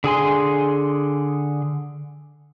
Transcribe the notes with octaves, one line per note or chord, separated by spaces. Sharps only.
D3 G#4 G#5 C6